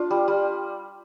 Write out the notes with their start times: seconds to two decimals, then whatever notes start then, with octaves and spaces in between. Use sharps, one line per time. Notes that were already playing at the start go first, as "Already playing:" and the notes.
Already playing: D4 F4
0.10 G3
0.28 G3